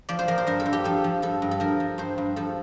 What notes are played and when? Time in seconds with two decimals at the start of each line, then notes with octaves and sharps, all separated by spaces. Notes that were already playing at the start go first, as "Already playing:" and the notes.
0.09 F3 D5
0.19 C5
0.28 F3 A#4
0.38 C5
0.47 G2 A#4
0.60 A4
0.66 G2
0.73 G4
0.84 F3 A4
1.04 F3
1.22 G2 A4
1.42 G2
1.51 A4
1.60 F3 A#4
1.80 F3
1.98 G2 C5
2.18 G2
2.36 F3 A4